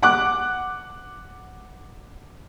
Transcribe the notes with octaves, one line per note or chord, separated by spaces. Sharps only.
F#5 D6 F#6